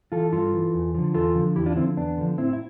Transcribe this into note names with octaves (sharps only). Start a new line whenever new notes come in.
E3 F4 A4
G2 F4 A4
E3
E2
D3 F3
E2 F4 A4
D3 F3
E2 E4 G4
D4 F4
D3 F3 C4 E4
E2 B3 D4
D3 F3
A2 C4 E4
E4